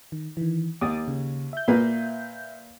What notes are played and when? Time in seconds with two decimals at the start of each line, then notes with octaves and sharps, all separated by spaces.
0.12 D#3
0.37 D#3 E3
0.81 D#2 D6 D#6 A6
1.08 C#3
1.53 E5 G6
1.68 A#2 A#3 B4